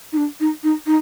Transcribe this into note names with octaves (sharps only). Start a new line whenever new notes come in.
D#4
D4
D#4
D#4
D#4